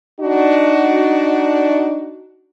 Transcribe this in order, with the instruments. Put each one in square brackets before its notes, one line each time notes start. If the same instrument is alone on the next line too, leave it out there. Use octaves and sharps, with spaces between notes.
[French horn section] D4 D#4 F#4